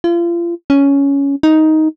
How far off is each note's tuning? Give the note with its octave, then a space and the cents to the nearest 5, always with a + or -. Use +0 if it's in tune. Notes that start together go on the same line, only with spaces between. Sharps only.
F4 -35
C#4 +10
D#4 +10